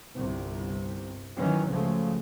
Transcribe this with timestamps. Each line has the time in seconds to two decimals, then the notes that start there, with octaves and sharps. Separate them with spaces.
0.15 G1 C2 C3
1.36 D#3 E3 F#3 C#4
1.68 C#2 C#3 F3 F#3 A3